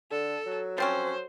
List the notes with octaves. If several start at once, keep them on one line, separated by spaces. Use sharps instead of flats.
D3 A4
F#3
F3 C4 C#4 C5